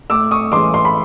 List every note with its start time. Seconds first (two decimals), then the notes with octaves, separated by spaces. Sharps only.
0.10 A2 D6 E6
0.31 C#6 D#6
0.52 E3 G#3 C#4 C6 D6
0.74 C6
0.85 B5